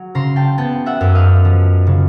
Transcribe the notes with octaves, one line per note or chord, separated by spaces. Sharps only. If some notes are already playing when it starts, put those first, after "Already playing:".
Already playing: F#3
C#3 A#5 C6
G5 A5
B3 G5 A5
E5 F#5
F#2
D#5 F5
F3
C#3